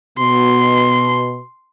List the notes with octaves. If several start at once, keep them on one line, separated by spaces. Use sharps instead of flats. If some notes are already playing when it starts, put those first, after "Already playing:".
B2 C6